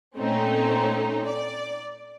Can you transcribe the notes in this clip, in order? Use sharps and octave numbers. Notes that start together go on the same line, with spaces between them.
A#2 A3 C4 C#4 D#4
D5